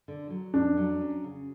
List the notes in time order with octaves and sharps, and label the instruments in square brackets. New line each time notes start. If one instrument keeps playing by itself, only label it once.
[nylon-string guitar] D3
F#3
[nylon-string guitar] F2 [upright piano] D4
[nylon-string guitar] F#3
C#4
C#3